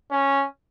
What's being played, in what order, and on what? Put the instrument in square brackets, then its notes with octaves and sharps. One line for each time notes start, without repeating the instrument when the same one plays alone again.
[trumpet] C#4